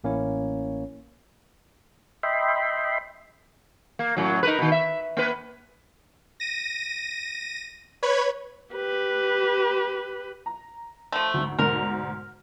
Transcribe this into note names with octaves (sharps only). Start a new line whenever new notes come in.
A1 A#3 C#4 E4 C#5
D#5 E5 G5 B5 C6
A#3
F#2 A2 F#3
D#4 A#4 B4
B2 D#3
E5
A#3 B4
A#6 D#7
B4 C#5 B5 G#6
G4 B4
A#5
F3 A3
D2 G#2
D2 G#2 B2 A#4